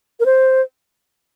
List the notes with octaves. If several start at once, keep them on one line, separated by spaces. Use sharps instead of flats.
A#4
C5